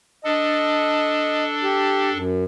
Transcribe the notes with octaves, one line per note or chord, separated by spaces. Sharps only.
D4 A4 D#5
G4
F#2